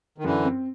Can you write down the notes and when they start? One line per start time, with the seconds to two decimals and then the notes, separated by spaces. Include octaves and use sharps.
0.18 D#3
0.24 F#2 D3 E3
0.44 C4